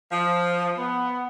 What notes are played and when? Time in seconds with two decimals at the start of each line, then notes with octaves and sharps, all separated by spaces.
0.12 F3
0.78 B3